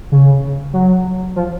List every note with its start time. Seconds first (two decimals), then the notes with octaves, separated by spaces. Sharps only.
0.12 C#3
0.73 F#3
1.36 F3